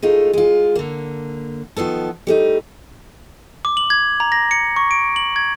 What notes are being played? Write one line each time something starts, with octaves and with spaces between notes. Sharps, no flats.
G#3 A3 D#4 F4
G#3 F4
D3 A#3
D#3 F3 B3 A4
G3 A3 D#4
D6
F#7
G#6
A#5
A#6
C#7
C#6
D7
F#7
G#6